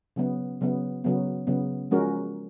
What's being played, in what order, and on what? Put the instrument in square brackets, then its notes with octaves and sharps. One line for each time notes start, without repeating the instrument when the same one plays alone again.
[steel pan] C#3 F#3 B3
C#3 F#3 B3
C#3 F#3 B3
C#3 F#3 B3
F3 G#3 C#4 F#4 A#4